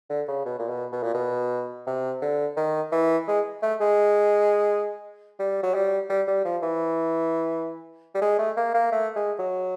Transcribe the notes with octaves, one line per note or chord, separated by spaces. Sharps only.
D3
C#3
B2
A#2
B2
B2
A#2
B2
C3
D3
D#3
E3
G#3
A3
G#3
G3
F#3
G3
G3
G3
F3
E3
G3
G#3
A3
A#3
A#3
A3
G#3
F#3